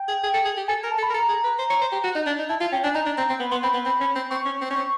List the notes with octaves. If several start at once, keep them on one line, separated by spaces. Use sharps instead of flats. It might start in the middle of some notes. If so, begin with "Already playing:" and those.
Already playing: G5
G#4
G#4
A4
G#4
G4
A4 G#5
G#5
A#4
A5
A4
B5
A#4
A4 A#5
G#4
B4
C5
C#5
C5
G4
F#4
D#4
D4
D#4
E4 A5
F4
C#4 G5
D4 G#5
D#4 A#5
D4
C4
C4
B3 B5
B3 C6
C4 B5
B3
C4
C#4
C4
C4 C#6
C#4
C4
C#4
C4